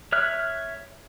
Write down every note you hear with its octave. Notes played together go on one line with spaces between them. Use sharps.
C#5 E5 F6 F#6